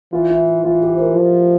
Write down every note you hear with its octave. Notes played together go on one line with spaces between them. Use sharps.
E3 F4
E4
E3 F4
G4
C5
A#4
F3